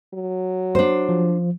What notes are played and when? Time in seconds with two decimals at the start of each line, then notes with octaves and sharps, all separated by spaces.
0.14 F#3
0.75 D4 C5
1.09 F3